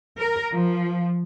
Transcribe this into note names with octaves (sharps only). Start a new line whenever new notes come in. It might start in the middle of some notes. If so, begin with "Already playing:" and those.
A#4
F3